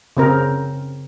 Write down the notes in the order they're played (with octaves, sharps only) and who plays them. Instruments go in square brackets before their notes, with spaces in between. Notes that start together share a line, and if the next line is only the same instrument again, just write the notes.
[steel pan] C#3 C4 A#4